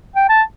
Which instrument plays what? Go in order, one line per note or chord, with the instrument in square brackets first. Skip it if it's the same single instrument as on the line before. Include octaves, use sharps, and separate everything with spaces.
[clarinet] G5
A5